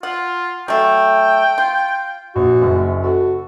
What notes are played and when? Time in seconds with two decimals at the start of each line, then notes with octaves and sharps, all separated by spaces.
0.03 F4 F#5
0.68 F#3 A3 G5
1.58 F4
2.36 A#1 F#4
2.62 F#1 F#2
3.03 F#4 A4